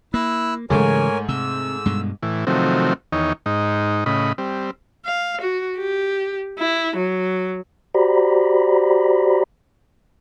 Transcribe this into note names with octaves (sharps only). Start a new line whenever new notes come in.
A#3 E4 E6 F#6
G#2 C#3 E3 F#3 A3 A#4 C#5 G#5
C3 E6
G2 B2 G#3
A2 E3
C3 D#3 F3 F#3 A3 C4
E2 D#3 D#4 C#5
G#2 D#4
A2 C#3 D#5 B5
G3 C4
F5
F#4
G4
E4
F#3
F#4 G4 C5 D5 A#5 B5